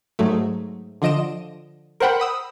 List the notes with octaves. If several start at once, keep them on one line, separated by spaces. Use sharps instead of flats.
G#2 F#3 A3
D3 F3 D#5 D7 E7
A#4 C5 F#5 G5 B5
B5 D#6 E6